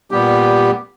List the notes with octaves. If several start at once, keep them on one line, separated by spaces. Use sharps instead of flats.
A#2 G3 B3 G4